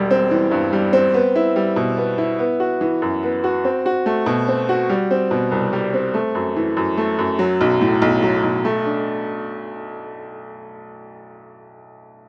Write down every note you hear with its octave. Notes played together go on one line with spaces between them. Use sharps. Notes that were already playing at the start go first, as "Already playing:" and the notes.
Already playing: E1 G3
C4
E3
G2
G3
C4
B3
E4
G3
B2
B3
E4
B3
F#4
E3
F#2
B3
F#4
C4
F#4
A3
B2
C4
F#4
G3
C4
B2
C2
G3
C4
A3
F#2
E3
F#2
A3
F#2
F#3
B1
A2
B1
F#3
B1
A3
D4